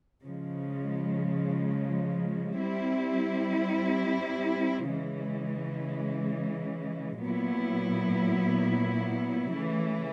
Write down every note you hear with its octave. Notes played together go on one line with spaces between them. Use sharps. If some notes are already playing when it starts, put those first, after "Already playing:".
C#3 F3 G#3
G3 C4 E4
C#3 E3 G#3
A#2 F#3 B3 E4
C#3 E3 A3